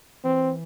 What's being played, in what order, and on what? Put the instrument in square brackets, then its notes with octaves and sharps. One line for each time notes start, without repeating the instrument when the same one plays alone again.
[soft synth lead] E3 [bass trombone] C4